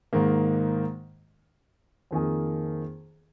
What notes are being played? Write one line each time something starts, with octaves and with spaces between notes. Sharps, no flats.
G#2 D#3 A#3
F2 D#3 A#3 G#4